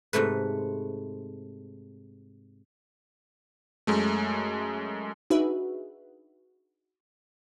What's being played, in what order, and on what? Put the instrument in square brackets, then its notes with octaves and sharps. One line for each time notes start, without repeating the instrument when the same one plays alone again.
[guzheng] G#2 C3 A3 B4
[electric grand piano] F#2 G#3 A3
[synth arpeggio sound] D4 D#4 F#4 G#4 B4 E5